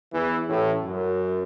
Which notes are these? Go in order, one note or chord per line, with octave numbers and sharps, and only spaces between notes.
E2 E3
A1 A2
F#2